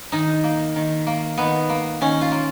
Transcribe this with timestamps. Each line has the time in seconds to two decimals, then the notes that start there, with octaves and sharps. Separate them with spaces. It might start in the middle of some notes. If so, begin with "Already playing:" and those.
0.12 D#3 D#4
0.44 A#3
0.76 D#3
1.07 A#3
1.38 D#3 B3
1.69 A#3
2.01 D#3 C#4
2.21 F4
2.32 A#3